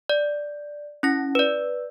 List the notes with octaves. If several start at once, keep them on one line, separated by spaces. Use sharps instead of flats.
D5
C#4 E4 A#6
B4 D5